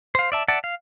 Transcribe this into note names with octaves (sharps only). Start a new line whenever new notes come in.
C5 F5
D5 E5 A5
D5 E5 F#5 A5
F5